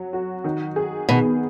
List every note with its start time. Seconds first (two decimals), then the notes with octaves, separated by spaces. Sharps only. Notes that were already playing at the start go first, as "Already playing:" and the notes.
Already playing: F#3
0.13 F#4
0.44 D#3
0.76 G#4
1.09 B2 D#3